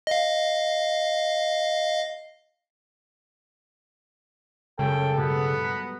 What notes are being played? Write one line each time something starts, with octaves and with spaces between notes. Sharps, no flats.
D#5 F5
F#2 C#3 G#3 A4 G5
G2 B2 A3 B3
A#5 F#6 B6